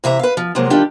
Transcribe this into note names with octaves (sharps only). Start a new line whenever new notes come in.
C3 E3 E5 A#5
B4 F5
F3
C3 F3 F#3 G#3 A#3
D#3 G3 D4 F4 G4 A4